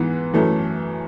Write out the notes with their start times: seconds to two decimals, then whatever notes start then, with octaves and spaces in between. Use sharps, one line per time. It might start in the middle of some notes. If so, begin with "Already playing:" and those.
Already playing: G#2 E3 B3
0.34 F#2 E3 A3